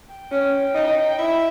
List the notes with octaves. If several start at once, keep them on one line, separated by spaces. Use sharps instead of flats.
G5
C#4
D#4
E4 E5